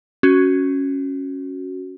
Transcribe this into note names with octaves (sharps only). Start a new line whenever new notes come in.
C#4 F#4